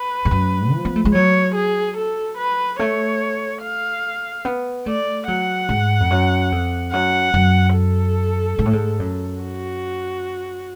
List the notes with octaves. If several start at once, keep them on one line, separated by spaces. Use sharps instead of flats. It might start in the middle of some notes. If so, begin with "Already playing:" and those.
Already playing: B4
G#2
F#2
F3
B3
A3
G#3
F#3 C#5
G#4
A4
B4
A3 C#5
F5
B3
A3 D5
F#3 F#5
G#2
F2
F#2
F2
F#2 F#5
F#2
A4
G#2
A2
G#2
F#2
F#4